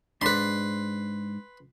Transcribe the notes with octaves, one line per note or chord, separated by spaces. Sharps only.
G#2 D4 B4 B5 C6